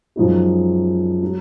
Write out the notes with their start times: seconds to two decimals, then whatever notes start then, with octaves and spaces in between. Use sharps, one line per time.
0.16 F#2 F3 G#3 D#4 F#4
1.23 F#3